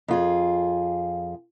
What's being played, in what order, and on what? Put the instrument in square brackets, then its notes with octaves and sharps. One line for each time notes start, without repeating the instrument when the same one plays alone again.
[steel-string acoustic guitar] F2 F4 G#4